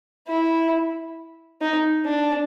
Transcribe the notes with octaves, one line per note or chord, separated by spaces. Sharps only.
E4
D#4
D4